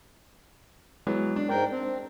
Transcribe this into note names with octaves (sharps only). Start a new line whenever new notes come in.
E3 F#3 G#3 B3
D4
G#2 D4 A#4 G5
C4